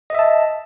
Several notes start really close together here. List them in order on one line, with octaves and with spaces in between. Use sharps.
D#5 E5 A5